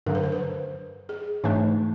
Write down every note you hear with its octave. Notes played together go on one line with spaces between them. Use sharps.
G2 D3 F#3 A#4
B4
C5
B4
G#4
G#2 E3 A3 D4 C#5